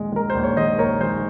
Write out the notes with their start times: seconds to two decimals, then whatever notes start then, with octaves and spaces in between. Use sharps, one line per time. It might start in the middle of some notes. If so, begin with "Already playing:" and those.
Already playing: A#1 G#3
0.12 G#3 A#4
0.30 A#1 C5
0.43 C#5
0.57 G#3 C5 D#5
0.79 A#1 A#4 C#5
1.01 G#3 C5